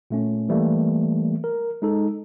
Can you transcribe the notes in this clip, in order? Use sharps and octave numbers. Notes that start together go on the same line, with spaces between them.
A#2 A3 C#4
E3 G3 A3 A#3
A#4
G#3 D#4 A4